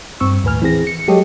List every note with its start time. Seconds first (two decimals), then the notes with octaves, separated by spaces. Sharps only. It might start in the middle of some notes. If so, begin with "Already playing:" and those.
0.20 G2 C4 C#6 E6
0.44 D#2 A2 B4 G#5 F6
0.62 E3 C4 G#4 A#6
0.87 C#7
1.08 F#3 G#3 G4 A4 C#5 D#5